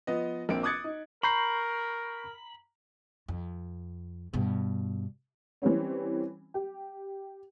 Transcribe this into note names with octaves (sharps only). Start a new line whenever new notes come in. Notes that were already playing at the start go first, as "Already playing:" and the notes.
F3 B3 D#5
A#1 A#3 C4 D7
D6 D#6 F#6 G#6 A6 C#7
D#4
A#4 A#5 B5 C#6 G6 C7
F2
G2 B2
E3 G3 C4 C#4
G4